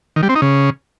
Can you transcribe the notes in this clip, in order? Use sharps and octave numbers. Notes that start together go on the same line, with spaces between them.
D#3
G3
C4
D#4
C#3